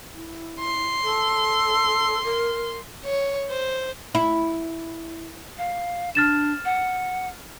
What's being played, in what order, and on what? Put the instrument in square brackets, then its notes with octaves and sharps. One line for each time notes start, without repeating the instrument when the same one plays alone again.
[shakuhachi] E4
[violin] C6
[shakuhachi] A4
A#4
[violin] C#5
C5
[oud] E4
[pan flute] F5
[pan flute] D4 [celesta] F6 A6 E7
[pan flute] F#5